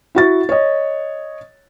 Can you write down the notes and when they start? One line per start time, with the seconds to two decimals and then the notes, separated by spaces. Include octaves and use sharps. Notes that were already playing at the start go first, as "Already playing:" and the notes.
0.15 E4 F#4 A6
0.49 C#5 D#5